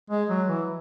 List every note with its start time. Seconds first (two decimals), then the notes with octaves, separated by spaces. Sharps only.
0.10 G#3
0.29 F#3
0.48 E3